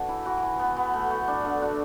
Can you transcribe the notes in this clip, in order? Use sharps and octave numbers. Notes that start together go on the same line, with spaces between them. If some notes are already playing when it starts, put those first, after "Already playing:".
Already playing: A3 D4 F#4 A4 B4
E3 E4
E3 F#4
E3
B3
B3
A3
A3
D4
D3 A4
D4 F#4